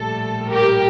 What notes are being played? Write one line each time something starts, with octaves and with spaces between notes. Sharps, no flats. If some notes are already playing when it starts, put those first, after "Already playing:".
Already playing: A#1 A2 G3 A4
G4 A#4